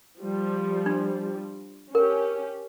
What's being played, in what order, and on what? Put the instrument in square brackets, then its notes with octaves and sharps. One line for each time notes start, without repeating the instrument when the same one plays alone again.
[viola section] F3 G3
[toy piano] D4
[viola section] C#4 G4 [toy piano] A#4